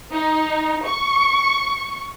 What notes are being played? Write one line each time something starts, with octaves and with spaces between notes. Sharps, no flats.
D#4
C#6